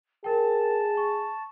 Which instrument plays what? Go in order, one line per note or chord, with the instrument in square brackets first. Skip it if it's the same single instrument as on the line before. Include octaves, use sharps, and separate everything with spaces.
[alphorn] G#4 [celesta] A#4 G5 [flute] A5
[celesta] C#6